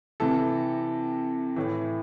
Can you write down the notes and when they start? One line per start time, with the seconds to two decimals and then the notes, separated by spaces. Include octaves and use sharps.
0.20 C3 E3 A4
1.56 A2 E3